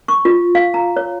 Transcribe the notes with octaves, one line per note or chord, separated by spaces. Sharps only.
C#6
F4
F5
A#5
C#5